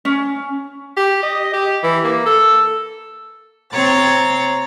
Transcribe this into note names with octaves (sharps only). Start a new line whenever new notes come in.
C#4
G4
D#5
G4
E3
A#3
A4
C3 C4 C#5 A#5 A6